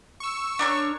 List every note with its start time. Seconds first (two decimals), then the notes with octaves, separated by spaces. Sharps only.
0.20 C#6 E6
0.59 D4 A#4 C#5